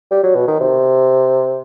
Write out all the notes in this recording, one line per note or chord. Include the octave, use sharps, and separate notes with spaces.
G3
F#3
B2
D#3
C3